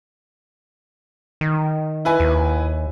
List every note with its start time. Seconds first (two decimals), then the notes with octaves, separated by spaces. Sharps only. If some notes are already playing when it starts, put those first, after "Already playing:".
1.41 D#3
2.05 E4 B4 G#5
2.20 D#2